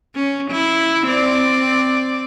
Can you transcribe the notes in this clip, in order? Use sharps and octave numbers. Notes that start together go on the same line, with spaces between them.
C#4
E4
C4 D5